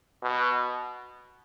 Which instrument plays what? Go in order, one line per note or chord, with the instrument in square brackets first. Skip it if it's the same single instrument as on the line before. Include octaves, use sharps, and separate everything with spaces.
[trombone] B2